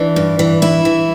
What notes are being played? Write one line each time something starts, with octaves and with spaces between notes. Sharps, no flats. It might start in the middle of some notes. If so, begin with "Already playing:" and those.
Already playing: E3 D4
G2
E3
G2 E4
E3